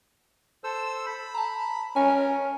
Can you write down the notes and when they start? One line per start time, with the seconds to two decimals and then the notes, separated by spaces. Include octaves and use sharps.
0.64 A4 C5 E6
1.06 B5
1.34 A5 A#5
1.96 C#4 A#4 G#5